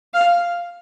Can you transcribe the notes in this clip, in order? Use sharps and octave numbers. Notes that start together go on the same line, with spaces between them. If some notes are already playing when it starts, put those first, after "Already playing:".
F5